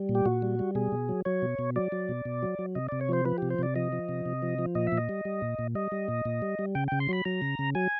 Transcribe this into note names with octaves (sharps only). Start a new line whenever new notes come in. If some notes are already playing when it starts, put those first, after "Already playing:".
Already playing: G3
A#2
G4
A#2 F#4
G3
G3
B2 G#4
B2
F#3
F#3 C#5
B2
B2
F#3 D5
F#3
B2
B2
F#3
F#3
C3 D#5
C3 D5
C#5
F3 C5
F3 B4
C3 G4
C5
C3 D5
F3 D#5
F3
C3
C3
F3
F3
A#2 D#5
E5
A#2
D#5
G3
G3
A#2
A#2
G3 D#5
G3
A#2
A#2
G3
G3
C#3 G5
C#3 G5
C6
F#3 B5
F#3 A#5
C#3
C#3
F#3 G#5